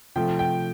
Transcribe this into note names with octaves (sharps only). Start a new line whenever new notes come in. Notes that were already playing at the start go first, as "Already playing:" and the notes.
C3 F3 A3 G5
G5